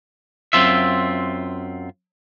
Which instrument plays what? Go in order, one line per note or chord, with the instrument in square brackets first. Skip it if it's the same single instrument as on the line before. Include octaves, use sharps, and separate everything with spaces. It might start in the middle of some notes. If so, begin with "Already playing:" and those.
[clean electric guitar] F#2 C4 F4 E5